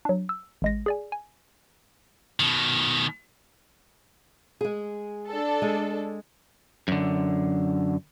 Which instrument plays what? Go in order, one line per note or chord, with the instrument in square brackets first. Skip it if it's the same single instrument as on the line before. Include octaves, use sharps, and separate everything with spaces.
[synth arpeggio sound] F#3 D4
E6
A1 G#3 A#6
G#4 D5 G#5
G#5
[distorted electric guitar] B2 D#3
[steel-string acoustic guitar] G#3 G#4
[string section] D4 A4
[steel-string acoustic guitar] G#3
[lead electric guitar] F#2 D3